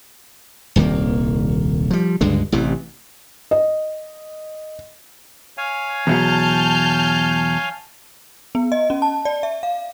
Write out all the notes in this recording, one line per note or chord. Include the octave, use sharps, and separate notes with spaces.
D#1 C2 D#3 A#3
F3 G3
C#2 G2 D3 G#3
A1 C3 E3
D#5
C#5 F5 G#5
E2 B2 F#3 A5 F6 G6
B3
D#5
C#4
A5
D5
E5
F5